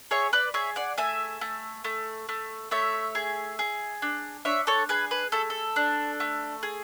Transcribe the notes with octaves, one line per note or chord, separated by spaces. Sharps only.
G#4 C#5 E5
B4 D5
G#4 C#5 E5
D5 F#5
A3 E5 G#5
A3
A3
A3
A3 C#5 E5
G#4
G#4
D4
D4 C#5 E5
A4 C#5
G#4 B4
B4
A3 A4
A4
D4
A3
G#4